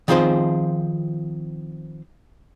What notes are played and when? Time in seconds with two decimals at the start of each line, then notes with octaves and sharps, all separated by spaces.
0.08 D#3 F3 C4 F4 G#4 C5